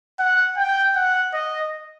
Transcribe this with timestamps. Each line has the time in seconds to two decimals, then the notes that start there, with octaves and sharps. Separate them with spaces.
0.19 F#5
0.57 G5
0.95 F#5
1.33 D#5